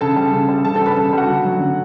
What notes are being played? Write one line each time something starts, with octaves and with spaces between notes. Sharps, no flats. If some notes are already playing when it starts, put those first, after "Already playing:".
C#3 A4 A5
G3
C#3
G3
C#3 A4 A5
A4 A5
G3
B4 B5
C#3 A4 A5
G3 F#4 F#5
D3
F#3 A3
D3